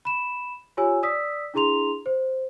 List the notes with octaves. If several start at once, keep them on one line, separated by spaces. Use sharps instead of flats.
B5 E7
F4 G4 C#5 G#5 E6
D5 D#6 E6 B6
D4 E4 G#4 A#5 C6 F7
C5